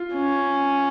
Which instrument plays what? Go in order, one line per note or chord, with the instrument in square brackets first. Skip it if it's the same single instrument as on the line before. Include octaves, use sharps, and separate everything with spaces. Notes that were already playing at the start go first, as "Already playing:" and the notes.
Already playing: [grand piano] F4
[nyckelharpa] C#4